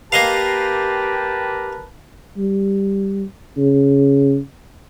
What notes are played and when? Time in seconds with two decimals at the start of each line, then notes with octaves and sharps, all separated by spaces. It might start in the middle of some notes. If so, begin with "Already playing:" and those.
0.12 A#3 G4 A#4 B4 D#5 F5 A5
2.37 G3
3.57 C#3